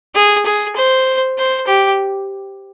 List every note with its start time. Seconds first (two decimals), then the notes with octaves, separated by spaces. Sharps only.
0.15 G#4
0.46 G#4
0.76 C5
1.38 C5
1.67 G4